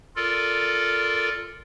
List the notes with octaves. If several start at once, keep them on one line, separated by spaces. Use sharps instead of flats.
F4 A4 A#4 D5